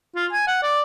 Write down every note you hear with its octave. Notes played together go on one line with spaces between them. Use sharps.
F4
G#5
F#5
D5